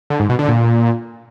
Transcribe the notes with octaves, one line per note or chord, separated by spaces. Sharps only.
D3
G#2
B2
D3
A#2